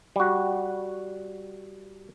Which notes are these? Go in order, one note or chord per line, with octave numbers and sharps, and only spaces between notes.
G3 F#4